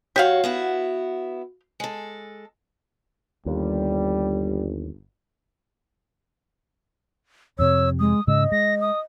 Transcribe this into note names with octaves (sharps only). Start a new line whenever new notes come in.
G2 F#4 G4 C#5 F5
B3 E4 F#4
G#3 A4
G1 D#2 G3
F2 C3 C#5 E6
G#3 D#6
G#2 C#3 G#3 D#5 E6
G#3 A#6
D#6